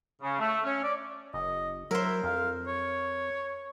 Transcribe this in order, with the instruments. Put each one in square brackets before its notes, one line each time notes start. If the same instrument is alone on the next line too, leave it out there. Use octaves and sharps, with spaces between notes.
[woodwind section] C#3
A3
C#4
D5
[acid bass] F#1 [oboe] D#5
[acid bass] F#3 [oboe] E4 [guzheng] A#4 C5
[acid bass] F2 [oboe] F5
[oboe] C#5